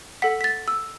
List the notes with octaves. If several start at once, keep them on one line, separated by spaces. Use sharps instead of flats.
A4 F#5 B6
B6
A6
E6